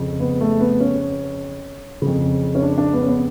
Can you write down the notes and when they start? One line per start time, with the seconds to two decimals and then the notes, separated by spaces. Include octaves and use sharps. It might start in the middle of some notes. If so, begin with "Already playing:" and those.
Already playing: F2 C#3
0.20 B3
0.41 A3
0.60 B3
0.80 C#4
2.02 F2 C#3
2.55 C#4
2.62 D4
2.78 D4
2.93 B3
3.02 C#4
3.08 B3